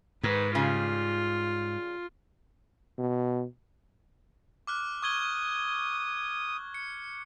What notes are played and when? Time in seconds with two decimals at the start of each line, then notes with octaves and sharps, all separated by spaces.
0.23 G#2 D#3 B4
0.55 C#3 G3 F4
2.98 B2
4.67 D6 F6 F#6
5.02 C#6 D#6 G#6 G7
6.74 C#7